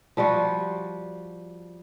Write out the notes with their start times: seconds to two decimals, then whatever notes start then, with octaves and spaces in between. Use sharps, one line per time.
0.17 F3 G3 F4 F#4